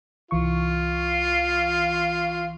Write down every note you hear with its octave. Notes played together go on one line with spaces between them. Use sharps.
C2 E3 F4 C#6